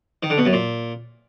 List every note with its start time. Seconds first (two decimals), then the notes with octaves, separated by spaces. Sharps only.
0.23 D#3
0.30 D3
0.38 B2
0.45 F#2
0.53 A#2